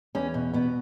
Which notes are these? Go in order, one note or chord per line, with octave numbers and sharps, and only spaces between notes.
E2 C#4
B2
B2 B3